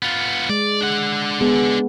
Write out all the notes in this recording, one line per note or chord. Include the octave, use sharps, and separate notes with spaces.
B3 F4
G#3 D5
D4 F#5
G#3 B3 G#4